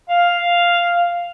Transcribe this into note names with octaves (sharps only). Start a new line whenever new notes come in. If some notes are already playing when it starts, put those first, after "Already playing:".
F5